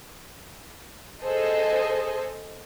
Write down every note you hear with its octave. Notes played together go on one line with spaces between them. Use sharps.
G#4 A4 C5 D#5